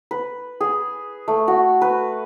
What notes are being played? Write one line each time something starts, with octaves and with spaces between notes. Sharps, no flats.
B4
G#4
A3
F#4
B4